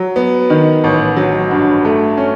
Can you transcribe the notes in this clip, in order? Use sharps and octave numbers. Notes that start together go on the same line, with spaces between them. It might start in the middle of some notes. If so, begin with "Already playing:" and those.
Already playing: F#3
B3
D#3
A1
F#3
G2
A3
C#4